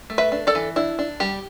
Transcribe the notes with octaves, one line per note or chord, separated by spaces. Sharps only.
A3
B4 E5
D4
A4 D5
E3
D4 E4
D4
G3 G4